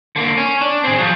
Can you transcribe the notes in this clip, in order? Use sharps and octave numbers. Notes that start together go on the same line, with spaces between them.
D3 A#3
C#4
D4
C4 G#4
F3 F#3